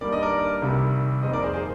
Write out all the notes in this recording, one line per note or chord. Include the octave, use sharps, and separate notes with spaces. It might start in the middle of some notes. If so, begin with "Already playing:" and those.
G2 D#3 G3 A#3 D5
D#5
A#4 D5
C2 C3 D#3 G3
F2 D#3 A#3 C5 D#5
A#4 D5
G#4 C5
G#4 C5